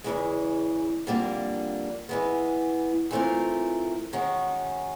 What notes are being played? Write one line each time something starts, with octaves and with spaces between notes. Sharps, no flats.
E2 C#3 E3 G#3
F2 D3 G3 A#3 D4
E3 G#3 B3
E3 A3 C4 F4 A#4
D#3 G#3 C#4 F#4